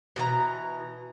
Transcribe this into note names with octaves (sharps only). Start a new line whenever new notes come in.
B2 E3 F#4 A#5